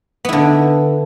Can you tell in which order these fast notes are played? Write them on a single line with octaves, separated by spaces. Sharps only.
B3 E4 D3